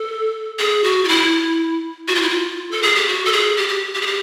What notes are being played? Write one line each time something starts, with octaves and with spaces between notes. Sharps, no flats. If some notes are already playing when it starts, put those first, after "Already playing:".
Already playing: A4
G#4
F#4
F4
E4
F#4
F4
E4
F4
A4
G#4
G4
F#4
A4
G#4
G4
G4
G4
G#4
G4